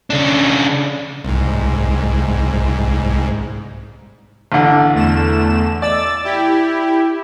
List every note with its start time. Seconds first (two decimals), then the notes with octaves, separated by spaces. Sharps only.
0.10 C#3 D4
1.24 C2 G#2
4.52 A1 D3
4.95 E2 A3 E7
5.82 D5 E6 A6
6.24 E4 G4